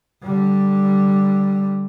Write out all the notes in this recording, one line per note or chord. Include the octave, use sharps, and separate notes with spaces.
D3 G3